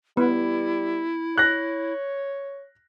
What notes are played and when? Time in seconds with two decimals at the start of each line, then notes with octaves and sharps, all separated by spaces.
0.17 G3 B3 E4
1.38 C#5 F#6 A#6